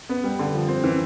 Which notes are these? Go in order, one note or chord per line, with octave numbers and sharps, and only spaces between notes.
B3
G3
D3
F3
C4
E3